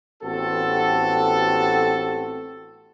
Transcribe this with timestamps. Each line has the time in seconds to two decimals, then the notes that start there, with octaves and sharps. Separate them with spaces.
0.23 A1 B3 C4 F#4 G4 A4